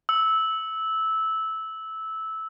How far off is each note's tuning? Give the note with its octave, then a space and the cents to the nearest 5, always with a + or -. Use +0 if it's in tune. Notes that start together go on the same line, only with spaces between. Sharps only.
E6 -15